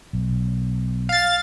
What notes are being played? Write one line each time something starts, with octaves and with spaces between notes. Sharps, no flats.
B1
F5 A6